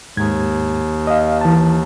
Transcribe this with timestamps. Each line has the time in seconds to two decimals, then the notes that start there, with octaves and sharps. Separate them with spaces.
0.17 D#2 G#2 G#6
1.07 D#5 F5
1.41 E3 A5